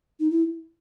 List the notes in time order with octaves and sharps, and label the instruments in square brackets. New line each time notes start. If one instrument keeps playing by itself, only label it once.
[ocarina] D#4
E4